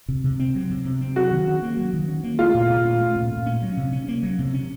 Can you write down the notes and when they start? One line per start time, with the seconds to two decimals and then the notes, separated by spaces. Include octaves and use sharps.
0.08 C3
0.24 C3
0.40 C4
0.55 F#3
0.70 C3
0.85 C3
1.01 C4
1.16 F#3 F#4
1.31 D#3
1.47 C#4
1.62 A#3
1.77 F#3
1.93 D#3
2.08 C#4
2.24 A#3
2.39 A3 F4
2.54 A#2
2.70 A#2
2.85 C#4
3.00 A3
3.16 A#2
3.31 A#2
3.46 C#4
3.62 F#3
3.77 C3
3.92 C#4
4.08 A#3
4.23 F#3
4.39 C3
4.54 C#4